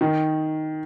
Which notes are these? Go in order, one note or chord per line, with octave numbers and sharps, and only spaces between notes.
D#3